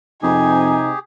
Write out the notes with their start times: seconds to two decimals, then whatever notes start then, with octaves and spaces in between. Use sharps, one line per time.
0.23 F2 C3 D#4 G4 G#4 G#5